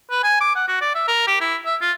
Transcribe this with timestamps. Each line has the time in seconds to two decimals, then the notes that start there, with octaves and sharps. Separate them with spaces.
0.10 B4
0.23 G#5
0.41 D6
0.55 F#5
0.68 F#4
0.81 D5
0.95 E5
1.08 A#4
1.27 G4
1.41 E4
1.65 E5
1.81 F4